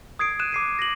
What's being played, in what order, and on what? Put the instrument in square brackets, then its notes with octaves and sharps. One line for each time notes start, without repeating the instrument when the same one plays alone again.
[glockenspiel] D#6 G#6 C7 D7
F#6 D#7 E7
D6 C7 D#7
A#6 F#7